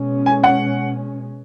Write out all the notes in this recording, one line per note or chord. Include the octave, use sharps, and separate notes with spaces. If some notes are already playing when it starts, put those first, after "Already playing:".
Already playing: B2 G#3 C#4
G#5
F#5